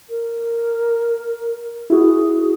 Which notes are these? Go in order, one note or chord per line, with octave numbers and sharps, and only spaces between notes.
A#4
E4 F#4 G#4